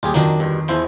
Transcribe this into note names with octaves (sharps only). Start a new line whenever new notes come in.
D#1 F4 G4 G#4
F2 D#3 F#3 A#3 D4
D2 G2
E2 F3 E4 C5